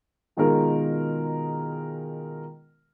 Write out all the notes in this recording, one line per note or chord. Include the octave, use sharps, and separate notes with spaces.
B2 D#3 G#3 F4 A#4